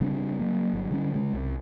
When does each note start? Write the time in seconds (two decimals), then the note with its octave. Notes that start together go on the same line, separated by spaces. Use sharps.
0.01 C#3 G3 C4 D4
0.39 F#3 A#3
0.73 G1 F#3 G3
0.91 D3 G3 C#4
1.14 C#3 G#3
1.33 C2